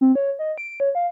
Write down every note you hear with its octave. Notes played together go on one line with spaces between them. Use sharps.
C4
C#5
D#5
D7
C#5
F5